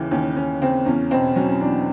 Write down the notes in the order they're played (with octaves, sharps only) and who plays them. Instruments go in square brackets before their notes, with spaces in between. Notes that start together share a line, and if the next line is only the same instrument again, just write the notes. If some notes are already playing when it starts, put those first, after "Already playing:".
Already playing: [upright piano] D#2 C#3 E3
D#2 C#4
D#2 C#4
C#3 C4
E2 C#4
B2 C4
F#3 C#4
C#4
E2 D4